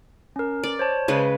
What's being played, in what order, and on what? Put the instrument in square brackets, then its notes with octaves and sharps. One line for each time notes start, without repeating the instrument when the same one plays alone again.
[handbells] C#4 A#4
[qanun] D5
[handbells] C5 C#5 A5
[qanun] C#3 G#3 B4